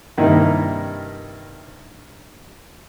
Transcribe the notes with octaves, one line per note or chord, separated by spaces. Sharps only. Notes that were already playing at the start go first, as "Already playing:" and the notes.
G2 C3 D#3 A#3 D#4 E4